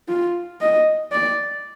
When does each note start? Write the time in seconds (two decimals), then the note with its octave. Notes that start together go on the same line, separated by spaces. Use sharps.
0.09 F4
0.61 D#5
1.12 D5